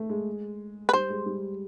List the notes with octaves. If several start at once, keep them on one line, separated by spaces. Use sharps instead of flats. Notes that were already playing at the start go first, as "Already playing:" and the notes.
Already playing: A3
G#3
B4
G3 C5
G#3
G3